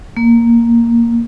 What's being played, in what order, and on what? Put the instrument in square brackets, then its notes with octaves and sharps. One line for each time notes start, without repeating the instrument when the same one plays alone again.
[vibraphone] A#3